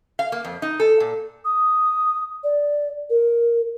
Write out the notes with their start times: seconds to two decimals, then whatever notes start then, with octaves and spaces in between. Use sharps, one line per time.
0.19 F5
0.32 A#3
0.44 F2
0.62 D#4
0.80 A4
1.00 A#2
1.45 D#6
2.44 D5
3.10 A#4